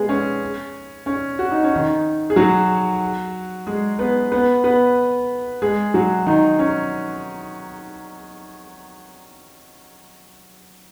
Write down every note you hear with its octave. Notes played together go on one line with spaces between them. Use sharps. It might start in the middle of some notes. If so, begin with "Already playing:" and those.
Already playing: G#3 B3 G#4
C#4
C#4
F#4
D#4
C#4
D#3 D#4
G#4
F#3 F#4
G#3 G#4
B3 B4
B3 B4
B3 B4
G#3 G#4
F#3 F#4
D#3 D#4
C#4